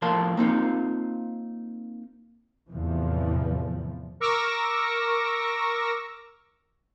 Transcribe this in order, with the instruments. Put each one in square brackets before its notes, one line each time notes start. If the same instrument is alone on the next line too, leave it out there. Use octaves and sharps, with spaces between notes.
[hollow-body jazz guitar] A2 F3 A#4 F5 A5 C6
A#3 C4 D#4 F4
[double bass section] E2 A2 C3 E3 F3
[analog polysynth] A#4 C#6 D6 E6 A#6